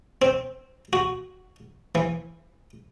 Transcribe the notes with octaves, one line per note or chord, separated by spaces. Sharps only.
C4
F#4
E3